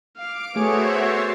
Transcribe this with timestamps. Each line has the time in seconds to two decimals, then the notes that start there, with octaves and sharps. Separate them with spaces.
0.18 F5 D6 D7
0.56 A3 B3 F#4 G#4 C5 C#5 E5
0.96 A6 C7